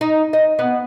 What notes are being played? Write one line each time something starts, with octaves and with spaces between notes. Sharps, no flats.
D#4
D#5
B3